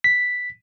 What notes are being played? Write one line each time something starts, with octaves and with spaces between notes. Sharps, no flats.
B6